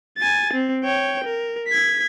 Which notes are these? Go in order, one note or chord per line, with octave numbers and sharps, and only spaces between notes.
G#5 A6
C4
C#5 G5
A#4
G#6 B6